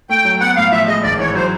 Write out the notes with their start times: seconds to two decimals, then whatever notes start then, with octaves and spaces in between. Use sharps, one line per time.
0.09 A3 G5
0.25 F#3
0.40 B3 F#5
0.56 A2 F5
0.72 F3 E5
0.87 G#3 D#5
1.03 G#1 D5
1.19 E3 C#5
1.35 F#3 C5